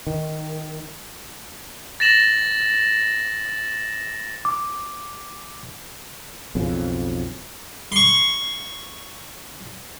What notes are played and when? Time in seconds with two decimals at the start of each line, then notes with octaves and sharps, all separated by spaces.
0.07 D#3
2.00 A6 A#6 E7 F#7
4.45 D6
6.55 B1 F2 C#3
7.92 C6 C#6